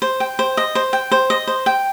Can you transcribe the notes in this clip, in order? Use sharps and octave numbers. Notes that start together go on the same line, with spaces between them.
C5
G5
C5
D#5
C5
G5
C5
D#5
C5
G5